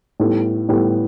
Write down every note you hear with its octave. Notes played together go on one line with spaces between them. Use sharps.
A2 G3 B3 E4 A4
A2 G3 B3 E4 A4